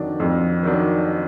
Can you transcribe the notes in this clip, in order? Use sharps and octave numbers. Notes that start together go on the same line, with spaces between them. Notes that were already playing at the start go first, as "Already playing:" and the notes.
Already playing: F2 D#3 F#3 D4
F2
D#3 F#3 D4